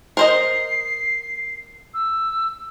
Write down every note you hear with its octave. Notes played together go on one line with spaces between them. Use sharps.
A#4 C5 D#5 C7
E6